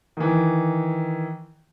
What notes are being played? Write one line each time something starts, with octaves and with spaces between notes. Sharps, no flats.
D#3 E3